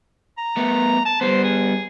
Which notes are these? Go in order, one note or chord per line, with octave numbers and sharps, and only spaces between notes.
A#5
A3 B3
A5
G3 B3 C5
G#4